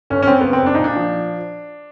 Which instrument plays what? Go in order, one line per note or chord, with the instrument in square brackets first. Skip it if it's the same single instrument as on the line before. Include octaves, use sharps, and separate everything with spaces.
[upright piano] G1 C#4
C#4
F#2 C4
C#3 B3
C4
F#1 D4
D#4
A#2 D4
F3